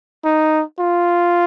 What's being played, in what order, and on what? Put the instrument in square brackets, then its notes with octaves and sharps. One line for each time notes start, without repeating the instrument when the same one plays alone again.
[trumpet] D#4
F4